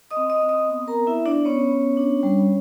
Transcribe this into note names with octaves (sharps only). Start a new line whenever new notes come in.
D#5 D#6
C4
D#5 D#6
C4
D#5 D#6
B3
A#4 A#5
B3
E4 E5
B3
D4 D5
B3 C#4 C#5
B3
D4
G3